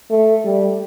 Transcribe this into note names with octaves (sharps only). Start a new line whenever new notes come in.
A3
G3